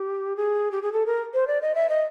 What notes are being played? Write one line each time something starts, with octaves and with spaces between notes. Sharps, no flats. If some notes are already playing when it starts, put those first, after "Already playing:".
Already playing: G4
G#4
G4
G#4
A4
A#4
C5
D5
D#5
E5
D#5